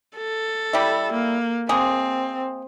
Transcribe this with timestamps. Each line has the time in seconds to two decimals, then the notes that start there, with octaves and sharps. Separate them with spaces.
0.17 A4
0.73 G3 E4
1.12 A#3
1.69 G#3 A#3 C4 G#4